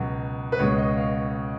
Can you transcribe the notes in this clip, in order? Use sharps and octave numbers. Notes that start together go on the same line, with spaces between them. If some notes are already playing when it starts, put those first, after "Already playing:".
Already playing: C#2 B2 F#3
B4
C#2 B2 G#3 C#5
D#5
F5